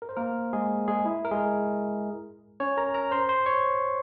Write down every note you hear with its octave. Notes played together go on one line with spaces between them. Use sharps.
A#4
C5
A#3 A#4
G#3 G#4
G#3 G#4
E4
A#4
G#3 G#4
C#4 C#5
A#4 A#5
A#4 A#5
C5 C6
C5 C6
C#5 C#6